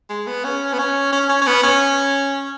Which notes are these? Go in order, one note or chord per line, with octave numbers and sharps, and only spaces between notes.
G#3
B3
C#4
B3
C#4
C#4
C#4
C#4
B3
C#4